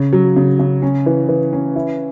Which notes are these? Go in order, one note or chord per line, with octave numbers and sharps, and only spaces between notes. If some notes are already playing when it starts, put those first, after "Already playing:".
Already playing: C#3
F#3
C#3
C#3
C#4
E3
E3
C#4
E4